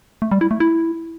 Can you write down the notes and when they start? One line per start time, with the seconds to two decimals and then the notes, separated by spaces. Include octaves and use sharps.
0.22 A3
0.31 G3
0.41 E4
0.51 A3
0.60 E4